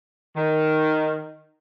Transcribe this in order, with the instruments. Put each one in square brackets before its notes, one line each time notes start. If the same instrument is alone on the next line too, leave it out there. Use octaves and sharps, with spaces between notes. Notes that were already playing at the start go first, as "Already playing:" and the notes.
[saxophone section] D#3